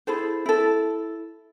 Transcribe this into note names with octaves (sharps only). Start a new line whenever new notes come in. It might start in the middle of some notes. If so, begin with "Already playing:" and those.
E4 G#4 A4 C5
E4 A4